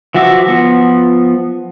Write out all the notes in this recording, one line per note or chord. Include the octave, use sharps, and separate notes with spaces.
E3 F3 F#4 E5 D6
F3 B3